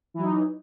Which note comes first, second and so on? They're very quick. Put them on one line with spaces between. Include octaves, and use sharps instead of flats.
E3 F#3 D#4